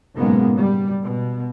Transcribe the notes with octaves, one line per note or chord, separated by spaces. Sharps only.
F#1 B1 G#2 G#3 A#3 B3
G3
B2